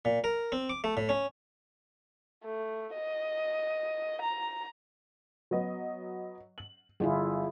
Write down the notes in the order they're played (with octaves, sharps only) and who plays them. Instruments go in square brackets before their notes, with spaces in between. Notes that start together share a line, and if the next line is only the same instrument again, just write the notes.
[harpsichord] A#2
A#4
C4
D6
A3
A2
C#4
[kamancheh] A3
D#5
A#5
[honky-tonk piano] F#3 B3 D#5
F#7
[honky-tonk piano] G1 [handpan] E4 F4 G#4